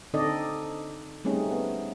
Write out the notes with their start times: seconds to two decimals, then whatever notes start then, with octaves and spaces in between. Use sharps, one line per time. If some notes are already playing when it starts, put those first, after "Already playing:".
0.14 D3 C4 D#4 A4 D5 D#5
1.24 G3 A3 C4 C#4 D#4 G#4
1.51 B3